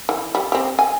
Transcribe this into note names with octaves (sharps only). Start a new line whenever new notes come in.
E3
G3
C4 G4
G#5